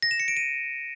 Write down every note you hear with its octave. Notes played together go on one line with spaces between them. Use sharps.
A#6
E7
C#7
D7
D#7